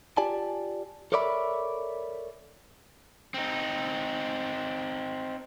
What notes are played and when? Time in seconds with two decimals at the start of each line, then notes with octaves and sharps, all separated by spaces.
0.17 F4 G4 D5 G#5 A5
1.12 A4 A#4 C#5 D5 E5 B5
3.34 C4 D#4